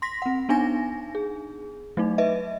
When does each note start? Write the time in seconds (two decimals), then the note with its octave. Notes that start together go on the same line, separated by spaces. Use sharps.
0.02 C6 A#6 B6
0.22 C4 F#5
0.49 B3 D4 D#4 G#5 A#6
1.15 G#4
1.97 F#3 A3 D#4
2.18 B4 D#5 E5